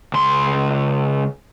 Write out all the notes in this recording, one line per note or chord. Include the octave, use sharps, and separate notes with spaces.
C#2 C6